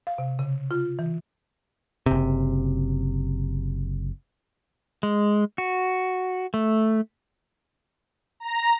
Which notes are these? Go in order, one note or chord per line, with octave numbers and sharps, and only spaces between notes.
F5
C3
C#3
F4
E3
F#1 C3
G#3
F#4
A3
A#5